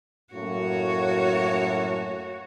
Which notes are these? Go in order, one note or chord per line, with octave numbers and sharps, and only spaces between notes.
F#2 A2 A#3 F#4 C#5